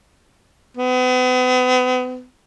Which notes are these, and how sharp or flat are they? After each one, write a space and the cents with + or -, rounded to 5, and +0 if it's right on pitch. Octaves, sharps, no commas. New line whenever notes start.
B3 +40